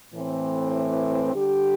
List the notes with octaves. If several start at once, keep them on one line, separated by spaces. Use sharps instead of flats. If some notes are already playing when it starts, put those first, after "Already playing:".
A2 E3 C4
D3 G3 D4 G4